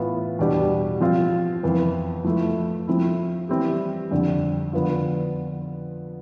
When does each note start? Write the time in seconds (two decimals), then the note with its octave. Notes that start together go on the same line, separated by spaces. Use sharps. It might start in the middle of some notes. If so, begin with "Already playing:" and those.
Already playing: A2 E3 B3 F4
0.39 E2 B2 G3 D4 G4
1.01 F3 C4 F4
1.63 F2 E3 B3
2.24 F3 A3 E4 A4
2.88 F3 C4 E4
3.49 E3 G3 C4 E4 G4
4.11 F2 D3 G3 D4
4.73 D3 F3 B3 F4